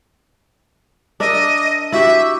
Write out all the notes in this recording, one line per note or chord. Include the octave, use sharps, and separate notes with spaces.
D4 A#4 D#5 E5
E4 F#4 G4 E5